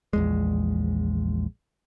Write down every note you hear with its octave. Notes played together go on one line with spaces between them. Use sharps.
A#1 E2 G#3